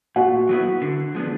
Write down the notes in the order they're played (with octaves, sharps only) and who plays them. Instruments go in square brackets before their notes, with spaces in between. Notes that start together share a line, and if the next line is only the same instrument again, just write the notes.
[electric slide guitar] A#2 [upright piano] F#4 F#5
[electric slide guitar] F#3 B3 E4
D3
F3 G#3 B3 D4